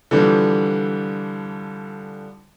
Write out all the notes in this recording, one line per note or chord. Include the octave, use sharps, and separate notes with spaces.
D3 E3 F3 G3